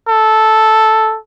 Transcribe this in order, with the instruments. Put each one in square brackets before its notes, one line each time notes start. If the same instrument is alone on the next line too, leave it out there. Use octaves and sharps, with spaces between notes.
[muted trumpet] A4